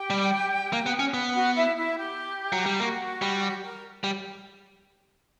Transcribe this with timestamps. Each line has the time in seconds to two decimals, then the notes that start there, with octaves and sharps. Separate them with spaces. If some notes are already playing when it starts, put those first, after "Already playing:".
Already playing: G4 G5
0.10 G3
0.73 A#3
0.86 B3
0.99 C#4
1.14 B3
1.34 F#4 F#5
1.55 E4 E5
1.76 E4 E5
1.97 G4
2.53 F#3
2.66 G3
2.79 A#3 F#4
3.22 G3
3.63 A#4
4.04 G3